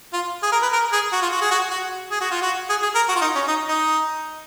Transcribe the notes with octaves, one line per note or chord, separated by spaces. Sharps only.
F4
G#4
A#4
B4
A#4
G#4
F#4
F4
F#4
G#4
F#4
F#4
G#4
F#4
F4
F#4
G#4
G#4
A#4
F#4
F4
D#4
C#4
D#4
D#4